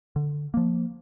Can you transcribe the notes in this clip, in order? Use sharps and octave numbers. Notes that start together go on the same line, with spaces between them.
D3
F3 A#3